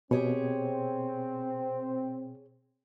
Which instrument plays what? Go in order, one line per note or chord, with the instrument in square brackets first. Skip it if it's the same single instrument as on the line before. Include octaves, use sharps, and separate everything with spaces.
[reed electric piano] B2 [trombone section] C4 [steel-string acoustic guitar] G4 G#4 C#5